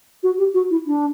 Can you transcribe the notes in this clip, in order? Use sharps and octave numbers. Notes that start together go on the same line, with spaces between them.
F#4
G4
F#4
E4
D4